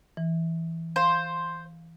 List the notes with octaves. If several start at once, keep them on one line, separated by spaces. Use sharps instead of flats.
E3
C5 F5 C6